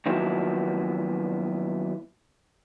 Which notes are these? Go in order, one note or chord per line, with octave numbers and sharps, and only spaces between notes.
D#3 F3 F#3 A#3 B3 E4